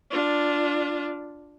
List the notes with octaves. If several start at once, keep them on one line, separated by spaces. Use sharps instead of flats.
D4 F4